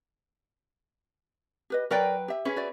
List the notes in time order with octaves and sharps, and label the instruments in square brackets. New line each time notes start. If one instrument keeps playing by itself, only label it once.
[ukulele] G4 B4 D#5
[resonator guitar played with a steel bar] F#3 B4 G5 [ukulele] A#4 D5
[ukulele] G4 E5
[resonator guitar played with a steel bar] C#4 G#4 B4
[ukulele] F#4 D5 E5